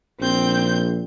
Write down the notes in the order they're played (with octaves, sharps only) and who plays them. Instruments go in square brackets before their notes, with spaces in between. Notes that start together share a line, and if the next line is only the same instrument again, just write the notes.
[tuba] A#1 [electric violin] C4 G6